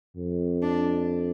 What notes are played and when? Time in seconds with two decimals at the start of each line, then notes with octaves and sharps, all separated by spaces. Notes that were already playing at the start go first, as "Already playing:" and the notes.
0.17 F2
0.63 D4